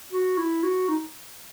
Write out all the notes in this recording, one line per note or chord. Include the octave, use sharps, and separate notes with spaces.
F#4
E4
F#4
D#4